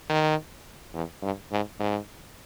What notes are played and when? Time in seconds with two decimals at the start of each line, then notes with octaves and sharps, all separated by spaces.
0.10 D#3
0.94 E2
1.23 G2
1.52 G#2
1.80 G#2